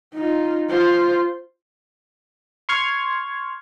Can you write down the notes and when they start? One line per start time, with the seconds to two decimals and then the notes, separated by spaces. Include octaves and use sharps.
0.14 D#4 F4
0.70 F4 C5
2.69 C6 C#6 F6 G#6